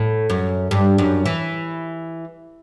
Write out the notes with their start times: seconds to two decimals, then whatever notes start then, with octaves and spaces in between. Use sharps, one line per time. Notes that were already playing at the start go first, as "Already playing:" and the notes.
Already playing: A2
0.30 F#2
0.71 G2
0.98 F#2
1.26 E3